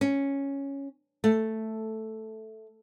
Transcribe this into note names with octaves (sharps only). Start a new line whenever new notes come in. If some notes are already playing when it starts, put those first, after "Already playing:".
C#4
A3